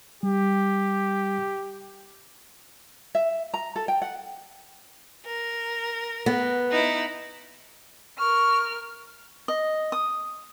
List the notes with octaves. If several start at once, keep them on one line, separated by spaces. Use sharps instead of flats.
G3 G4
E5
A#5
A4
G5
F#5
A#4
B3
D#4 E4
A#4 C#6 F6
D#5
D#6